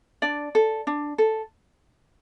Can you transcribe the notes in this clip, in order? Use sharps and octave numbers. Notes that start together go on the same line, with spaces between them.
D4 D5
A4
D4
A4